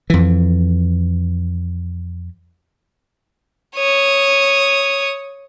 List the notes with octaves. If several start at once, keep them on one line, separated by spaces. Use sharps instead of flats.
F2 E3
C#5 D#6